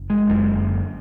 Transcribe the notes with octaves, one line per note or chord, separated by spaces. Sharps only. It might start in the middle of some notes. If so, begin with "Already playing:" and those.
Already playing: F#1
G#3
F#1 F#2 D3